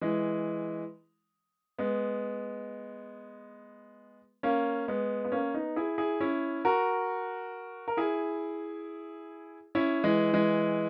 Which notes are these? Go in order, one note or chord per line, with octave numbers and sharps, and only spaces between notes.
E3 G#3
G#3 B3
A#3 C#4
G#3 B3
B3
A#3 C#4
B3 D#4
E4 G#4
E4 G#4
C#4 E4
F#4 A#4
A#4
E4 G#4
C#4 E4
E3 G#3
E3 G#3